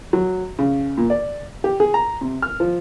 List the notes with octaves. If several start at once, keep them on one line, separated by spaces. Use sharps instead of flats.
F#3
C#3
A#2
D5
G4
G#4
A#5
C3
F6
F3